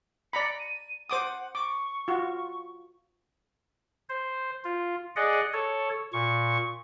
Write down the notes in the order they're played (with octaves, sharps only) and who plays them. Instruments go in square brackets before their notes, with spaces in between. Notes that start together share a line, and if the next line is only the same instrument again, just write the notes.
[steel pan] D5 A#5 B5 [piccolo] C#7
[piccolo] D#7
[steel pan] C5 D6 D#6 [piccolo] F#5
[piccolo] C#6 [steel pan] D6
[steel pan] F4 F#4
[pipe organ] C5
F4
G#4 D5 D#5 F#5
A4 C#5
A#2 C#6